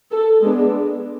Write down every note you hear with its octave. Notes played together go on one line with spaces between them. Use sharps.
A4
G#3 B3 D4